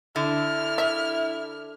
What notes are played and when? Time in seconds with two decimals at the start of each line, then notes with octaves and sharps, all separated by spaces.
0.16 D3 E4 F6
0.78 E5